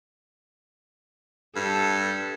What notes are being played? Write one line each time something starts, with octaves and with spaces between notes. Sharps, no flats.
G2 A4